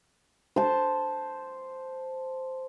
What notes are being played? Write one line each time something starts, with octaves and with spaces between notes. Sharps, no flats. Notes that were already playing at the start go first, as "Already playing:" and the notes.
C5 A5